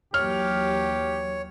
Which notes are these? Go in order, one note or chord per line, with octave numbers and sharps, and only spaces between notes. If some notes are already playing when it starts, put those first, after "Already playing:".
D#2 E3 F#3 G4 C#5 F6